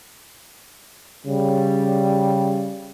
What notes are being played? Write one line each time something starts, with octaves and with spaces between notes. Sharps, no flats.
C#3 G3